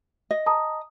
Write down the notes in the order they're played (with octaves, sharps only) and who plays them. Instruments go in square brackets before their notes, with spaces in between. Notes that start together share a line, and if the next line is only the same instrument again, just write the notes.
[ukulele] D#5
[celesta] A5 A#5 D#6